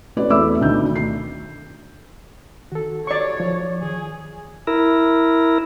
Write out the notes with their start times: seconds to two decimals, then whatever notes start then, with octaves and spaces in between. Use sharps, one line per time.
0.17 A3 C#4 F#4 B4 D5
0.30 E2 A3 E5 B5 D6 E6
0.61 D2 B2 D#3 D#4 G6
0.96 C7
2.72 D#3 F#4 A4
3.07 C#5 D5 C#6
3.40 F3
3.82 G#4
4.67 E4 A#4